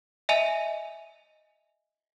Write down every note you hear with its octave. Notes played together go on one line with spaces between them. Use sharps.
D#5 E5 G#5 D#7 F7